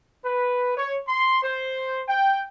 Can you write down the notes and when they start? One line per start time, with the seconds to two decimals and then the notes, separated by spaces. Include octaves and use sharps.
0.24 B4
0.77 C#5
1.08 C6
1.43 C5
2.09 G5